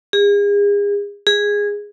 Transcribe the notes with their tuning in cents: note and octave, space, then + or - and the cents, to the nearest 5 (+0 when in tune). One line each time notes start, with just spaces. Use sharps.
G#4 -35
G#4 -10